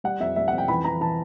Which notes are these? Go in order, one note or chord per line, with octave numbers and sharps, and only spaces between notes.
G3 F#5
F2 E5
G3 E5
F#5
F2
G5
E3 B5
E3 A#5
E3 A5